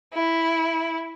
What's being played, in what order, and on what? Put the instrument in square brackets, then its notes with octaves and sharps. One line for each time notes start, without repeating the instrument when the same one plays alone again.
[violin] E4